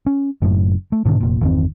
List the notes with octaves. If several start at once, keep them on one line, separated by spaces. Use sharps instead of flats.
C#4
F#1 F#2 A2
A3
G#2 B2 D3 D#3
F1 A#2
G1 E2 D#3 C4